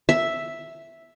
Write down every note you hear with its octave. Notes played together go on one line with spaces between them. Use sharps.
E5